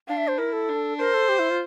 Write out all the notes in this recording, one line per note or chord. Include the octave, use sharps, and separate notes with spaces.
D4 F5
E5
C5
E4 A#4
A4
D4
A#4 C5
A4
G4
E4
F4